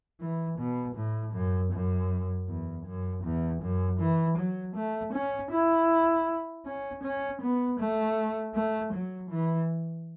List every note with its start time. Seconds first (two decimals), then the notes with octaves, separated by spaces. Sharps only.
0.21 E3
0.59 B2
0.96 A2
1.34 F#2
1.73 F#2
2.48 E2
2.87 F#2
3.24 E2
3.62 F#2
4.00 E3
4.38 F#3
4.76 A3
5.13 C#4
5.51 E4
6.66 C#4
7.04 C#4
7.42 B3
7.80 A3
8.55 A3
8.94 F#3
9.31 E3